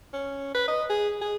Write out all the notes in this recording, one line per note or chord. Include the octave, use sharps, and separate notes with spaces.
C#4
B4
D#5
G#4
G#4